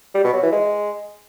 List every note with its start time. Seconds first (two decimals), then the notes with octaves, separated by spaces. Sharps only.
0.15 G3
0.24 B2
0.33 F#3
0.43 E3
0.52 G#3